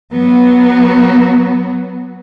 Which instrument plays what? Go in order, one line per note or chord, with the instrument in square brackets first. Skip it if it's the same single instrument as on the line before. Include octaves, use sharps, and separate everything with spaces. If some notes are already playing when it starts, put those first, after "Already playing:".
[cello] F#3 B3